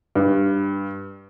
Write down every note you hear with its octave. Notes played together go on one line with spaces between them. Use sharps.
G2